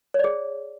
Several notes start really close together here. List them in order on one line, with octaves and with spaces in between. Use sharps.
C#5 D5 G#4